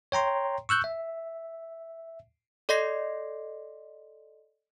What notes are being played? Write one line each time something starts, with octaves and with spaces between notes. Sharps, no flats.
C#5 G5 A#5 C6
C#6 E6 F#6 G6
E5
A4 D5 D#5 C6 A#6 C7